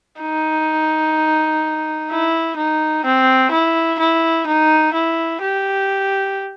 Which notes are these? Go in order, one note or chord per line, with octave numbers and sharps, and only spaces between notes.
D#4
E4
D#4
C4
E4
E4
D#4
E4
G4